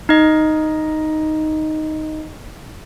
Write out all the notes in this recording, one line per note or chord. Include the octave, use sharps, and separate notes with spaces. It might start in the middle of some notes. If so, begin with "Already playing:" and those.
D#4 D#5